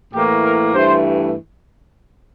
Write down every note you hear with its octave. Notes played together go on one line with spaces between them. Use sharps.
A2 E3 A#3 G4
A#4
G2 E3 A3 C5